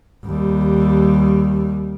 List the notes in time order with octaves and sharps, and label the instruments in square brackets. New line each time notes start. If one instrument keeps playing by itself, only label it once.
[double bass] D#2 G3